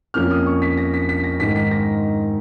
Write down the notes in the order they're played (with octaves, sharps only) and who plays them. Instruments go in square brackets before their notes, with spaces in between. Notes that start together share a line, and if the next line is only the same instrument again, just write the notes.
[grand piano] F2 F3 A#3 C#4 F6
D#6
C#6
B6
A#6
B6
B6
A#6
G#2 D#3 G#3 B6
B6
A#6